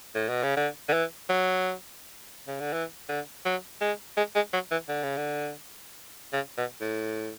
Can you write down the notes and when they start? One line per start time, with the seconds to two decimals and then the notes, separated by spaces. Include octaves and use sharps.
0.15 A2
0.29 B2
0.43 C#3
0.57 D3
0.89 D3
0.93 E3
1.29 F#3
2.48 C#3
2.60 D3
2.73 E3
3.09 D3
3.45 F#3
3.81 G#3
4.17 G#3
4.35 G#3
4.53 F#3
4.71 E3
4.89 D3
5.03 C#3
5.17 D3
6.33 C#3
6.58 B2
6.81 A2